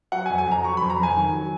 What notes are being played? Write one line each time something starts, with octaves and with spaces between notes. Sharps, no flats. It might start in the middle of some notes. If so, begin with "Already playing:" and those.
F#3 F#5
G#5
F2
G#5
F2 A#5
F#3 C#6
F2 B5
A#5
F2 G#5
D#3
F#3